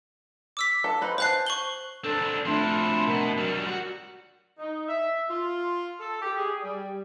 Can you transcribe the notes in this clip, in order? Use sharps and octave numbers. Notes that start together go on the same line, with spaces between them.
D6 E6 B6
A4
D#4 B4 C5
C5 F#5 A5 F#6 C7
C#6 F#7 G7
C4 D4 A4
F3 A3 C4 D4 E4 C6
B2 A#4
F#3 G3
F#4
D#4
E5
F4
A4
G4
G#4
G3